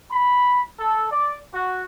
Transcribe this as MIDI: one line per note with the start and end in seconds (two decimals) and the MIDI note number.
0.10 0.62 83
0.79 1.07 69
1.11 1.37 74
1.53 1.82 66